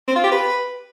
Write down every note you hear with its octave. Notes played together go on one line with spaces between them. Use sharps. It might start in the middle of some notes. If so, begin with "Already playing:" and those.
C4
F4
G4
B4